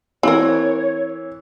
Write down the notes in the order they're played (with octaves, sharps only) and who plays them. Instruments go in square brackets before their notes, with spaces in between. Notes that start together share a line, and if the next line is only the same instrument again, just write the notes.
[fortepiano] E3 [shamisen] C4 A#4 [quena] C#5